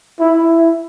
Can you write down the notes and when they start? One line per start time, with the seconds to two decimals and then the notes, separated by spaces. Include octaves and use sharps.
0.20 E4